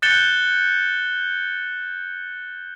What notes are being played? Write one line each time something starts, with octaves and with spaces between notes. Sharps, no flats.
F#6 G6 A6 C#7 E7 G7